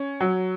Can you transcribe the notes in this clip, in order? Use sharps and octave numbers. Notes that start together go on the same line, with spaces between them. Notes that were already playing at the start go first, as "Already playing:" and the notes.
Already playing: C#4
F#3